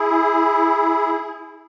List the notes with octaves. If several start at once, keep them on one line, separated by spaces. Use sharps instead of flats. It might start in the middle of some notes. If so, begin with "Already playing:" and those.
Already playing: E4 G#4